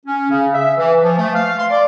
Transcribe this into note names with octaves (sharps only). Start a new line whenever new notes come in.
C#4
C#3
E5
E3
F3
A3
F5
C6
D5